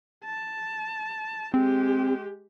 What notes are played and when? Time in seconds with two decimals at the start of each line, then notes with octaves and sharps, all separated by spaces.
0.25 A5
1.54 G#3 C4 G4